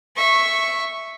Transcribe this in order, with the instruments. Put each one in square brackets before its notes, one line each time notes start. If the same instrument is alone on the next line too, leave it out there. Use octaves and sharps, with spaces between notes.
[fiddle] E5 C#6